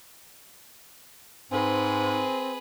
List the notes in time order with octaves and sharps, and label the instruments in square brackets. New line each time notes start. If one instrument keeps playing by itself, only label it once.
[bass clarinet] G#2 [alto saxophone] C4 [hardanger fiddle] G#4 B4